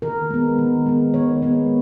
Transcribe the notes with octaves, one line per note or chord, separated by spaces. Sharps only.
D#3 A#4
G#3 B3
D#3
G#3 B3
D#3 C#5
G#3 B3